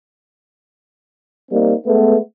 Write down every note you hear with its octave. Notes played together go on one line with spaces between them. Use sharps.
G3 A#3 C4 D#4
G#3 A3 B3